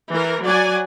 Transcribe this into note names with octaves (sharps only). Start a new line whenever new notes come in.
E3 A#4
F#3 D5 F#5 G#5